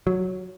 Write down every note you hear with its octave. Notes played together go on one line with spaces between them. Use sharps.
F#3